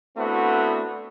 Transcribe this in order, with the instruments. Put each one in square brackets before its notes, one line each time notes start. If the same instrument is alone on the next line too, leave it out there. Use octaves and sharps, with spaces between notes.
[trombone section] A3 B3 C4 D4 E4 F#4